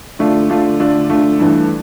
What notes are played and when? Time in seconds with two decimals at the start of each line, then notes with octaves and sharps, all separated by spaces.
0.19 D3 A3 D4 F4
0.50 D3 A3 D4 F4
0.80 D3 A3 D4 F4
1.10 D3 A3 D4 F4
1.40 G2 E3 A3